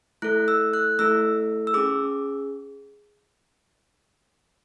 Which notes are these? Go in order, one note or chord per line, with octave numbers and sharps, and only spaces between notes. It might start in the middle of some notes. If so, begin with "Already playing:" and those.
A3 E4 A4 F#6
E6
F#6
A3 E4 A4 E6
E6
C#4 G#4 D6